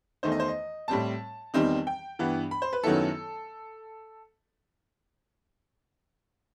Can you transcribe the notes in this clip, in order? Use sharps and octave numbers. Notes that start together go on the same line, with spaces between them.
E2 D#3 A3 D#4 C5
D#5
C5
D#5
A2 G3 C4 A5
E2 D#3 G3 C4 D#4
G5
G2 E3 B3
B5
C5
B4
F#2 D#3 F#3 B3 E4 A4